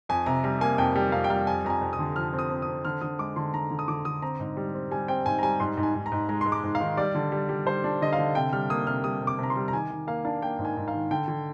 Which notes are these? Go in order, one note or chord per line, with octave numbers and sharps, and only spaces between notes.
F2 G#5
C3 A#5
G3 A#5
A#3 G#5
F2 G5
G3 G5
F2 F5
G5
G3 F5
F2 G#5
F2 A#5
G#5
F2
D#6
D3
F3 F6
C4
D#6
C4
D#6
C4
D3 F6
D3 D#6
G#3 D6
D3 C6
D3 A#5
D3
D#6
D3 D6
D3 D#6
C4 A#5
G#2
G3
C4
G3 G#5
C4 G5
G#2 G#5
A#5
G3 G#5
G#2 C6
G#2
G#5
G#2
A#5
G#2
G#3 A#5
G#3 C6
D6
G#2
F5
D#3
G3 D5
D3
G3
G3
G3 C5
D4
D3 D#5
F5
D3
C3 G5
G3 F6
A#3 D#6
C3 F6
G3 D#6
C3
D6
C3 A#5
C6
G3
A#5
D#3 G#5
D#3
A#3 F5
D4 F5
A#3 G5
G#2
G#5
G#2
F5
D#3
D3 G5
D3